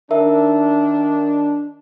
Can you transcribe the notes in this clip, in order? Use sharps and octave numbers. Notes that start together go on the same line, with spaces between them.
D#3 D4 A#4 E5